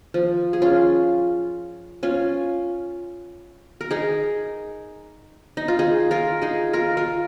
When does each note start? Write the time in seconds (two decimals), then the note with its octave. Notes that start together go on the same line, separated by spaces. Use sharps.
0.14 F3
0.53 G#4
0.62 C#4 F4
2.03 C#4 F4
3.81 A#4
3.91 D#4 G#4
5.57 D#4
5.68 F4
5.79 D#4 G#4
6.11 F4 A#4
6.42 D#4 G#4
6.73 F4 A#4
6.97 F4 A#4